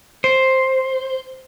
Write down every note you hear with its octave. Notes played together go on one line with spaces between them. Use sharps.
C5